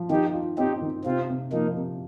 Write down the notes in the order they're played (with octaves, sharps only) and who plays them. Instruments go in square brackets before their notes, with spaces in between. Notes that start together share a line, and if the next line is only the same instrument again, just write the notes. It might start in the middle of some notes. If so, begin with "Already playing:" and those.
Already playing: [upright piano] F3
[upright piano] D#3 [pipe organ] D#4 G4
[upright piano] F4
[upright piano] C4 [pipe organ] D#4 G4
[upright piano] D#3
[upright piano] C3 [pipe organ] C4 F4
[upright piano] C3
[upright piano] F3 [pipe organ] A#3 D#4
[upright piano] C3